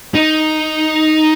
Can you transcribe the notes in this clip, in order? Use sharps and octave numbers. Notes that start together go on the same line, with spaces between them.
D#4